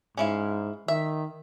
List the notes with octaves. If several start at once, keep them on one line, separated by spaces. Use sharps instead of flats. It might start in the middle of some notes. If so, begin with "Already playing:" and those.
G#2 C#4 E4 F5
D#3 E5